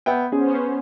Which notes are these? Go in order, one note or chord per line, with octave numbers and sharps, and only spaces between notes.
B3 E5 G5
B3 C#4 G#4 C5